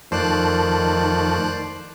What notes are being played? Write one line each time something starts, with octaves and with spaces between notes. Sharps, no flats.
F2 D#3 A3 C5 D5 F#6